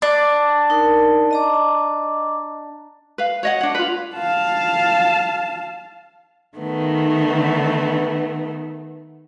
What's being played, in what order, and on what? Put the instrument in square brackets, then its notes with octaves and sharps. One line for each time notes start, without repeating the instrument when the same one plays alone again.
[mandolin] D4 [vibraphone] D6
[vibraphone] D#4 A#4
D#5 A#5 D6
[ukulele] B4 F5
C#5 D#5 F#5
D4 F#5
F4 B4
[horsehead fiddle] F5 A5
[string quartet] D#3 A3 B3